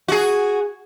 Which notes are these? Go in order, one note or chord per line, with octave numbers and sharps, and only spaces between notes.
F#4 G#4